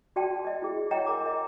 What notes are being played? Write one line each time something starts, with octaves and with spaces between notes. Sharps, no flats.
F#4 D5 G5 A5
D5 D#5
E4 G#4
C#5 D#5 F#5 G5 A#5
A#4 G#5 A#5 D6
D#5